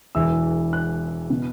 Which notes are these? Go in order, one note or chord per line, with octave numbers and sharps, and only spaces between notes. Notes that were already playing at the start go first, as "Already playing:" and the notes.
E1 E2 E3 E6
F#6
B2